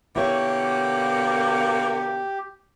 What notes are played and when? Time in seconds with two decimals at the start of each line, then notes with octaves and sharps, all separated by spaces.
0.16 B2 D3 A#3 E4 G4 C#5